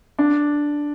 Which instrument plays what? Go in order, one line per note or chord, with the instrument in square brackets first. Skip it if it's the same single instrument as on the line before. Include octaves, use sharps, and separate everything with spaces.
[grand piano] D4